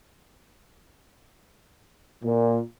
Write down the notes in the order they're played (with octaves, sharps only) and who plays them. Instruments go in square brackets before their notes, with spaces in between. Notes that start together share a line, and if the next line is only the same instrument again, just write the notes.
[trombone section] A#2